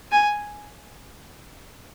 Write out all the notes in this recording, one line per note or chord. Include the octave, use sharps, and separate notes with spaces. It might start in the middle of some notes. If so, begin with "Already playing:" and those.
G#5